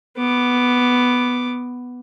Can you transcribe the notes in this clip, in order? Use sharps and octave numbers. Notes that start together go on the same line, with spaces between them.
B3 D6